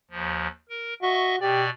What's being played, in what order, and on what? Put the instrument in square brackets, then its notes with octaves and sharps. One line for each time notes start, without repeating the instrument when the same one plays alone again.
[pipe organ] D#2 F3
A#4
[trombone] F#4 [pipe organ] D#5 E5 C#6
[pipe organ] B2 D5 [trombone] G4